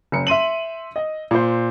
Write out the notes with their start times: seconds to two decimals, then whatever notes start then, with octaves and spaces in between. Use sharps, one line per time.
0.12 F#1 C#7
0.27 E5 C6 D#7 F#7
0.96 D#5
1.31 A#2 C5